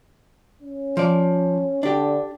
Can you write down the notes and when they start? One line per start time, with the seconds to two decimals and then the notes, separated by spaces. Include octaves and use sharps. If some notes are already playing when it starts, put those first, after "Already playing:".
0.62 C#4
0.97 F3 D5
1.83 D3 D4 G4